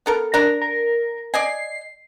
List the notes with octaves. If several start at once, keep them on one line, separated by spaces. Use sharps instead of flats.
B3 A4 A#4
D4 A#4 A#5
A#4
D5 D#5 G#5 C7